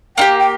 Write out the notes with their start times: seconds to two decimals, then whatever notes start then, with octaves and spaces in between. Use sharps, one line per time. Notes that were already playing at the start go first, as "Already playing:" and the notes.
0.17 A#3 D#4 G4 G5
0.40 G5